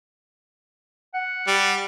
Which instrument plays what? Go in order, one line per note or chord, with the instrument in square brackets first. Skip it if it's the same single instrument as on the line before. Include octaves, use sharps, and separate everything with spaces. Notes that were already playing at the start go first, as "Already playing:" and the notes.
[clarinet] F#5
[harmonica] G3